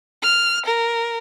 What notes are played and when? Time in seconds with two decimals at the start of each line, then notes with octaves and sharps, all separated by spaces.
0.23 F6
0.66 A#4